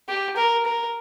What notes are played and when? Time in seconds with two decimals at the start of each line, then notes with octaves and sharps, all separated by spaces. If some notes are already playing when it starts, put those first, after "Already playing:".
0.09 G4
0.37 A#4
0.65 A#4